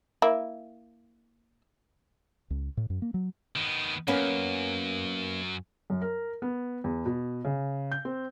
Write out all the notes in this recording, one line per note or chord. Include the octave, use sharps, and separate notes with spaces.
A#3 E4
C#2
A2
F#2
A#3
F#3
D#3 B3
F#2 A#3 B3 C#4
F#2
A#4
B3
E2
B2
C#3
G6
C4